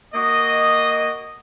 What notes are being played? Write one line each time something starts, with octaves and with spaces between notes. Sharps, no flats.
A#3 F#4 D#5